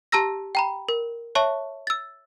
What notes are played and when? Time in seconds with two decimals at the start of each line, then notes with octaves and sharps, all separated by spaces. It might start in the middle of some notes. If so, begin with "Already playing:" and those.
0.12 G4 A5 A#5 E6 A#6
0.55 G5 A#5 B5
0.89 A#4
1.35 C#5 E5 A5 C#6
1.87 E6 A6